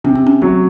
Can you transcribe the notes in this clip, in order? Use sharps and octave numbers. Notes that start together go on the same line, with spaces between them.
C3 C#4
C4
C#4
F#3 A3